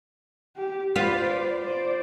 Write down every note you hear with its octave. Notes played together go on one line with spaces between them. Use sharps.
G4
F4 B4 C5 D5
C5 D5